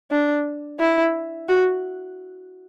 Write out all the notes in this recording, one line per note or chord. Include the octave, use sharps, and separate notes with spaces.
D4
E4
F#4